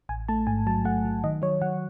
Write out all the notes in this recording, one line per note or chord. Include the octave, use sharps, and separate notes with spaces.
A1 G#5
A3 A5
G#2 G#5
F#3 A5
A3 F#5
F#3
D#3 D#5
F#3 C#5
F#3 F#5